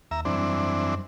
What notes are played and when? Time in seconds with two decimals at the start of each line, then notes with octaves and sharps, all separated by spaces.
0.11 D#2 E5 A#5
0.25 F#2 E3 G3 C4 D4